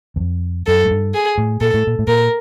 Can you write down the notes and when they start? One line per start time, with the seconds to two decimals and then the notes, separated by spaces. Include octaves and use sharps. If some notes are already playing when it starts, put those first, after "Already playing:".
0.16 E2
0.20 F2
0.67 F#2 A4
0.85 G#2
0.91 G2
1.14 G#4
1.38 A2
1.61 A#2 A4
1.74 A2
1.87 A#2
1.99 A2
2.07 A#2 A#4